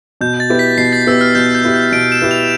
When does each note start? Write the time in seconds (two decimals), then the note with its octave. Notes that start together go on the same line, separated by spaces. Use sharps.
0.21 B2 G6
0.40 A6
0.50 B3 E4 G4
0.59 B6
0.78 B2 C7
0.93 A6
1.07 B3 E4 G4 E6
1.21 F6
1.35 B2 G6
1.55 G6
1.64 B3 E4 G4
1.74 G6
1.92 B2 D7
2.12 E7
2.22 B3 E4 G4
2.31 F7